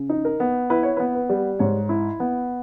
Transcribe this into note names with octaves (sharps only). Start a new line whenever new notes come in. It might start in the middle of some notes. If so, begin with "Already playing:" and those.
Already playing: C#3
D#4
A#4
B3
E4 B4
C#5
B4
B3
B4
G3
G#2 C#5
E4
B3